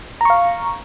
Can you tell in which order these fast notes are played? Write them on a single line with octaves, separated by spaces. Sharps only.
A#5 C#6 F5